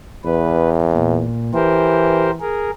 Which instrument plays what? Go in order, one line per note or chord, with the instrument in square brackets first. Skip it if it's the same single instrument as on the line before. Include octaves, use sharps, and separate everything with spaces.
[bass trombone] E2 [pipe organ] B4
[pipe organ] A#2
[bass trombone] E3 [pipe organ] G4 A#4 C5
[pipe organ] G#4 A#4